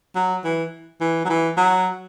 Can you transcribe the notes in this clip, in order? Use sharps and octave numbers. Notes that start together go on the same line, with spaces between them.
F#3
E3
E3
F#3
E3
F#3